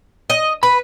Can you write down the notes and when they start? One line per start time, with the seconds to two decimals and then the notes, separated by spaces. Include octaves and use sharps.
0.30 D#5
0.63 B4 B5